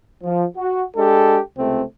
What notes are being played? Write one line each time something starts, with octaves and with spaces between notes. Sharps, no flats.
F3
F#4
G#3 D4 G4 A4
C#2 C3 A3 C4